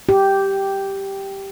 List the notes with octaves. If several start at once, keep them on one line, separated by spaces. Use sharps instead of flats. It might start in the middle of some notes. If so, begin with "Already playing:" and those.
G4